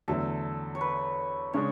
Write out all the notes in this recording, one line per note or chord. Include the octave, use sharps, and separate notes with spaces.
E2 D3 F#3 A3 A4
C#5
B4
C#3 G#3 D4 C#5